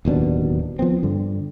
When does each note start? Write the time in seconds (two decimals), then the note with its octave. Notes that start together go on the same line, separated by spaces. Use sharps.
0.05 D1 D#2 B2 D4
0.79 F3 B3 C4
1.03 G2 D3